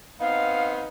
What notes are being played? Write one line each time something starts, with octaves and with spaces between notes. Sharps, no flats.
B3 C4 D#4 F5